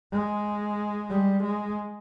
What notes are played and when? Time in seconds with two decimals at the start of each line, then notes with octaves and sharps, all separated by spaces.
0.13 G#3
1.10 G3
1.43 G#3